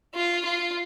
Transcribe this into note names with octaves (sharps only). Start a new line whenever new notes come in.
F4
F4